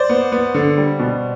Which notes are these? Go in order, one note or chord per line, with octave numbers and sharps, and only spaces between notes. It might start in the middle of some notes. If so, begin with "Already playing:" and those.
Already playing: C5 D5
B3
B3
D3
G3
B2